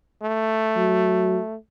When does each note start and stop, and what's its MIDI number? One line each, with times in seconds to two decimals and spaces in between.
0.22 1.56 57
0.76 1.39 54